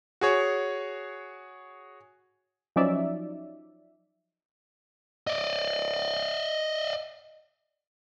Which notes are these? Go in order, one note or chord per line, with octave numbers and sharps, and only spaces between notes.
F#4 G#4 C#5
F3 F#3 C#4 D#4 D5 E5
D5 D#5